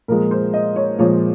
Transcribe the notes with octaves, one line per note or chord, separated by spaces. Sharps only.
A#2 F3 G#3 A#4
C5
D#5
C#5
A#2 F3 G#3 C#5